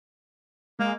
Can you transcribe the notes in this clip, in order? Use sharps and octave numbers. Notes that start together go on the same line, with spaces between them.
G#3 A#3